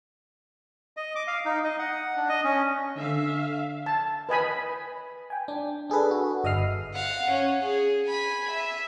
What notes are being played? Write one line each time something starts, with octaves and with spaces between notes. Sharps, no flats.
D#5
D6
F5
D#4
D#5
F#5
D4
D#5
C#4
D3 E5 F5
A5
B4 D#5 G#5 B5
G5 G#5
D4
D4 G#4 A4 B4
F#4
G1 D#5 E5 D#6 F6 C7
F5 F#5
C#4
G#4
G#5 B5
E5